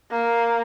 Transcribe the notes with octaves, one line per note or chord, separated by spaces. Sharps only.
A#3